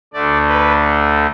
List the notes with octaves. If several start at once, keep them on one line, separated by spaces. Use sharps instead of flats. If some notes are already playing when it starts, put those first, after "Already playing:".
D2 D3 A3 D5
B4